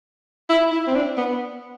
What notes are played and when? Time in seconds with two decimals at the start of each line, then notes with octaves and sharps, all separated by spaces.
0.49 E4
0.72 E4
0.87 C4
0.95 D4
1.18 B3